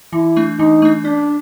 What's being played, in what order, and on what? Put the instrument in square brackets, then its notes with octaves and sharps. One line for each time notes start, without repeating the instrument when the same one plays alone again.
[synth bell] E3 [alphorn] E4
[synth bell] A3 D4
[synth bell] E3 [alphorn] D#4
[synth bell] A3 D4
[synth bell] C#4 [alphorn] D4